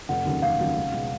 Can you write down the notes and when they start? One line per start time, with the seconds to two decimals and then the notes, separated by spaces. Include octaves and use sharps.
0.09 F1 F#5
0.25 D#2 C#3 F#3
0.42 F1 F5
0.60 D#2 C#3 F#3
0.76 C#2
0.93 B2 G#3 D#4